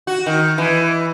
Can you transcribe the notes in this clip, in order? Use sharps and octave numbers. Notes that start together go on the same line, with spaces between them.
F#4
D#3
E3